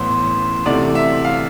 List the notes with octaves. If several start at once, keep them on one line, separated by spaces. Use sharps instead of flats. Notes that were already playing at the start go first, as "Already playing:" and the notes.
Already playing: A1 A2 E3 B3 C5
D2 C3 E3 A3 D5
E5
F5